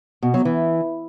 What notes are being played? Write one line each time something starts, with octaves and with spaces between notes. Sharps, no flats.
B2
F#3
E3